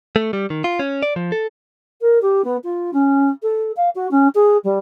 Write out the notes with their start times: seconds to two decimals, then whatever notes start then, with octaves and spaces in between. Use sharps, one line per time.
0.16 A3
0.33 G3
0.50 D#3
0.64 F4
0.79 C#4
1.03 D5
1.16 F3
1.32 A4
2.01 A#4
2.21 G4
2.44 B3
2.63 F4
2.93 C#4
3.42 A4
3.76 F5
3.95 F#4
4.10 C#4
4.34 G#4
4.64 G3